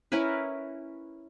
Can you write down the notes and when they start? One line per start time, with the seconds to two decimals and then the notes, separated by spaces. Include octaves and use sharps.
0.12 C#4 E4 A#4 B4